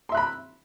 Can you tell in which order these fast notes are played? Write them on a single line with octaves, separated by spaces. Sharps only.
C6 E5 F#6 B5